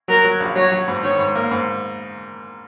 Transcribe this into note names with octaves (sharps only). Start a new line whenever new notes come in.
F#3 A#4
F#3
A#1
F#3 C#5
F#3
G#2
D#3 C#5
G#2
A#3
G#2